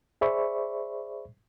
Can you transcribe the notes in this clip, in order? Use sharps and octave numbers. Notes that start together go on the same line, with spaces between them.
G#4 C5 D5 E5 B5 C#6